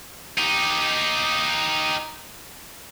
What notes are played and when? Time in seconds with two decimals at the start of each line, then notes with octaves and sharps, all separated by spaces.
0.38 D#4 G4